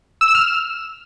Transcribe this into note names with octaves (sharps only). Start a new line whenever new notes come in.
E6
E7
F6